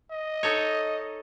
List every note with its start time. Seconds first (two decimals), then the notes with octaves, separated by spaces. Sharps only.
0.11 D#5
0.43 D#4 A4 C#5